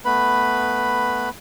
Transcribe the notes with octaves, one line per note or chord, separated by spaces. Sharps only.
A3 B3 B4 B5